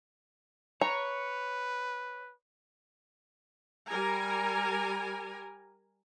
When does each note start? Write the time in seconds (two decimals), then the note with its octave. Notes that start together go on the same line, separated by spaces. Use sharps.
0.81 B4 C#5 A#5
3.87 G3 A#4 G#5 A#5